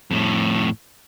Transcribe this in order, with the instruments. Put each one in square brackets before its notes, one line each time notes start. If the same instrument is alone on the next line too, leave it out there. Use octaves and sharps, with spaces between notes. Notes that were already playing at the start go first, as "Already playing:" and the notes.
[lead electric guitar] F2 A2